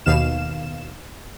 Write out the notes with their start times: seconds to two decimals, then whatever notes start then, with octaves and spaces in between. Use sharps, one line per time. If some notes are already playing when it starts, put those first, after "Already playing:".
0.06 D#2 B2 F5 E7